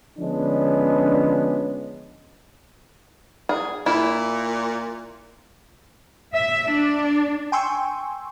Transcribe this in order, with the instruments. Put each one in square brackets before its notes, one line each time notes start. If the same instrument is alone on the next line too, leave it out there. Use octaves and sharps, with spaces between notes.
[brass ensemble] D3 F3 G#3 B3 C#4 D4
[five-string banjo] G#4
[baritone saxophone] A#2 [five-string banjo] E4
[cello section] E5
D4
[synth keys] G5 G#5 C6 C#6 E6